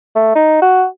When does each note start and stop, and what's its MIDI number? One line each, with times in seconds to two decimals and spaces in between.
0.15 0.35 57
0.35 0.59 63
0.62 0.85 66